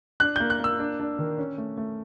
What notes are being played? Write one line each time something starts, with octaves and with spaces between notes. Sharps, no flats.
D4 F#6
G6
A#3
F#6
A#3 E6
D4
D4
D#3
C#4
A3
A3